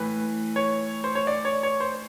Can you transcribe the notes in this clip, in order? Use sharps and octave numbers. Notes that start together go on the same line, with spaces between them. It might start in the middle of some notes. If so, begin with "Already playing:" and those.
Already playing: A2 E3 B4
C#5
C5
C#5
D5
C#5
C#5
C5